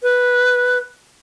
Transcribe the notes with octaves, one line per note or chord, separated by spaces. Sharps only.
B4